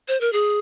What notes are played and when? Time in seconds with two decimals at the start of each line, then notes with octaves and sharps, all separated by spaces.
0.08 C5
0.21 A#4
0.33 G#4